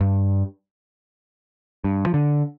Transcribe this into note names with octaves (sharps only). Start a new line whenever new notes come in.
G2
G2
F3
D3